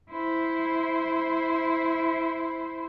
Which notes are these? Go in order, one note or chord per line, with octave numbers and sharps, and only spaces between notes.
E4 C5